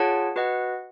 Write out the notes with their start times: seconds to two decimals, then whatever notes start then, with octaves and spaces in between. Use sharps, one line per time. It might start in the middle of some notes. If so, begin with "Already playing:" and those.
Already playing: F4 G#4 C#5 F#5 A5
0.36 F#4 B4 D#5 F#5